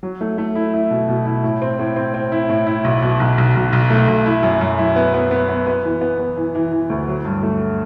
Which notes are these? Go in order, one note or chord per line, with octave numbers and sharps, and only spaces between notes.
F#3
A3
A3
E4
E4
B2
B2
E4
A2
C4
A2
C4
C4
E4
A2
E4
B1
B2
B1
B1
B1
B1
A3
B1
E4
F#2
F#2
E4
B3
B3
B3
B3
B3
E3
B3
B3
E3
E3
E3
D2
F#3
G2
A3